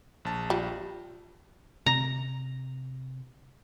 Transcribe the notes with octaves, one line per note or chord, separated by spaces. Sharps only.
A#1 A5
G3 F4
C3 A#5